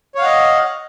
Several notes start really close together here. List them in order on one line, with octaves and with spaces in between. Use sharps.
C#5 F5 F#5 D#5